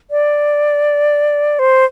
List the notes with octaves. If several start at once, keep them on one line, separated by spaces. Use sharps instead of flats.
D5
C5